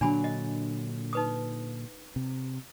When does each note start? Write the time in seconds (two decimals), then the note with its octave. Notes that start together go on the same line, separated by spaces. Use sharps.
0.01 A#2 D3 F#3 D4 G#5 B5
0.24 D#5
1.13 D#4 B4 D#6
2.16 C3